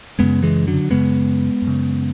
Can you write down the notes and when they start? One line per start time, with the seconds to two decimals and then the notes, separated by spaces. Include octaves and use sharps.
0.19 F#2 C#3 G#3 B3
0.43 E3 G#3
0.67 D3 F#3
0.90 F#2 C#3 G#3 B3
1.62 F#2
1.67 C#3